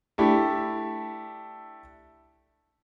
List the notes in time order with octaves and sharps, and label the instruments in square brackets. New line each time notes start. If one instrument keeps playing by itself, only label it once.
[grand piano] A3 D4 E4 G4